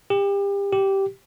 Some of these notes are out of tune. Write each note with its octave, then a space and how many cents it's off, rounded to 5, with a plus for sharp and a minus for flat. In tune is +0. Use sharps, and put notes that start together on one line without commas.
G4 +30
G4 -10